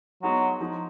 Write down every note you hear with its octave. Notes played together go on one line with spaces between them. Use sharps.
F#3 G#3 B3 D#4 F#4
F3 G#3 D#4